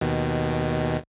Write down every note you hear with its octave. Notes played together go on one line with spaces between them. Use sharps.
D#2 B2 D#3